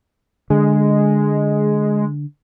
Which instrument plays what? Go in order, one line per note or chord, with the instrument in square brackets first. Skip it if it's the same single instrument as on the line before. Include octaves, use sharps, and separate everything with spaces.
[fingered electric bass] D3 [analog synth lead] G#3